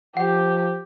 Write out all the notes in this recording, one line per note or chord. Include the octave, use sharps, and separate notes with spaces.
F3 G4 F#5